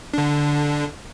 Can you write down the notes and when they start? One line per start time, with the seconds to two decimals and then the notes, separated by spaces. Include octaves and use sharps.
0.14 D3 D4